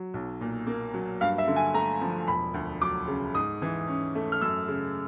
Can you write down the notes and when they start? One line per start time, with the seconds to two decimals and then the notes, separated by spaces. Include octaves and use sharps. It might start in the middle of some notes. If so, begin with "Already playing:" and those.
Already playing: F#3
0.14 B1
0.41 A#2
0.67 A#3
0.94 F#3
1.21 G2 F5
1.38 E5
1.47 D3
1.56 G#5
1.74 A3 A#5
2.01 F3
2.28 E1 B5
2.54 D2
2.81 F#3 D6
3.08 C#3
3.34 G#2 D#6
3.62 E3
3.87 C#4
4.15 A3
4.32 F6
4.41 F#2 E6
4.68 C#3